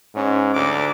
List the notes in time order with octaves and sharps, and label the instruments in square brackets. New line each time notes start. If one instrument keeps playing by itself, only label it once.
[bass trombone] G#2 [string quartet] C#4
[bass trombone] D2 [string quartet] D6